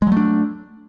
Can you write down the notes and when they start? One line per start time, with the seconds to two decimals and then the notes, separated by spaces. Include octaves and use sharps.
0.02 G#3
0.07 F#3
0.12 A3
0.17 D4